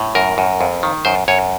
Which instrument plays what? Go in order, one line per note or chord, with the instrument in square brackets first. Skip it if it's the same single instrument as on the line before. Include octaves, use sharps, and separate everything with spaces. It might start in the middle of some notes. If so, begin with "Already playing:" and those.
Already playing: [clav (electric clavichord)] A2
F#2 A#4
F#2
F2
D#3
F#2 C5
F#2 C#5